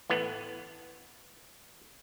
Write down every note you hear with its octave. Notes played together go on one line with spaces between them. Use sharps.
A2 E3 B3